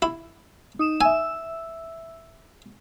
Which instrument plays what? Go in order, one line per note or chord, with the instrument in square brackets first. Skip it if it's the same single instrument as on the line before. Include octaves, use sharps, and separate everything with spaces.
[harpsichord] E4
[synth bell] D#4 D#6 E7
[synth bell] E5 E6 [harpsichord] G#5